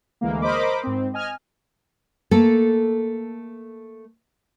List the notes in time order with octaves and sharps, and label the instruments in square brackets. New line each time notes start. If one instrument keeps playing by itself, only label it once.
[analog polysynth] D2 E3 G#3 A#3
A#4 C5 D#5 B5 D6
G#2 C4
D#5 G#5 F6
[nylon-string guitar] A3 A#3 A4